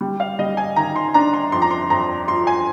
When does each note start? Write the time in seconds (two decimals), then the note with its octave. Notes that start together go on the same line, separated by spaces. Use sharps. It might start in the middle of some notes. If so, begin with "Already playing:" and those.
0.01 G3
0.20 F5
0.39 G3 D#5
0.57 G#5
0.76 D#3 A#5
0.96 C6
1.14 D4 A#5
1.33 C6
1.52 F2 C6
1.62 A#5
1.71 C6
1.90 F2 A#5
2.28 F4 C6
2.47 G#5